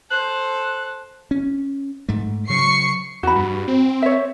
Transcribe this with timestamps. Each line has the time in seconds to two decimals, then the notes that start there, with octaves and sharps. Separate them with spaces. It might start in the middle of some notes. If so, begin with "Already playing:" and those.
0.10 A4 C5 F#6
1.31 C#4
2.09 G#2 A3
2.50 C#3 F#3 C#6 C7 C#7
3.23 E2 F#4 B5
3.36 G2
3.68 C4
4.02 C#5 E5